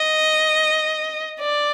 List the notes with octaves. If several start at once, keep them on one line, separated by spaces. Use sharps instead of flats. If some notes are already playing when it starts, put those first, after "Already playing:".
Already playing: D#5
D5